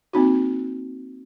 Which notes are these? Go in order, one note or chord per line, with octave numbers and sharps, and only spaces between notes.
A#3 C4 D#4 F#4